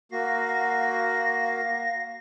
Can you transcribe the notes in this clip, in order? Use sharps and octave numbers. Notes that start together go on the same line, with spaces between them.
A#3 F#4 F5 A#6